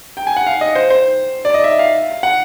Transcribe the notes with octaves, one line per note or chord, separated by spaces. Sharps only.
G5
G#5
F#5
F5
D#5
C5
C5
D5
D#5
E5
F5
F#5